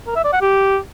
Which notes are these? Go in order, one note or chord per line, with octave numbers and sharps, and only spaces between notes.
A#4
E5
D5
F#5
G4